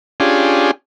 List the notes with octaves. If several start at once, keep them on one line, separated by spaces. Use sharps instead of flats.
C#4 D4 F4 G4 G#4